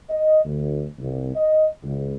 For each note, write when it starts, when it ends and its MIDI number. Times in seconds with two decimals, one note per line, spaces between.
0.10 0.39 75
0.44 0.85 38
0.99 1.31 36
1.35 1.67 75
1.83 2.16 37